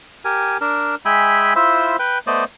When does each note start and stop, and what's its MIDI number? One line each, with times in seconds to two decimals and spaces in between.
0.25 0.57 67
0.25 0.57 70
0.25 0.57 80
0.61 0.95 62
0.61 0.95 70
1.05 1.53 56
1.05 1.53 76
1.05 1.53 79
1.05 1.53 80
1.05 1.53 83
1.56 1.96 64
1.56 1.96 65
1.56 1.96 72
1.56 1.96 76
1.99 2.18 71
1.99 2.18 79
2.27 2.44 57
2.27 2.44 59
2.27 2.44 72
2.27 2.44 74
2.27 2.44 75